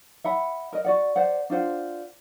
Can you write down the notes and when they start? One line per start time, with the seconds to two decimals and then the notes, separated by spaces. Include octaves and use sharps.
0.24 E5 F#5 B5
0.72 A#4 D#5
0.84 F#4 D5 F#5
1.16 C5 D5 F#5
1.50 D4 F4 C5 F#5